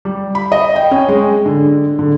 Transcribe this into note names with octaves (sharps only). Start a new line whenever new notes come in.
G3
B5
D#5
G5
C#4
G#3
D3
D3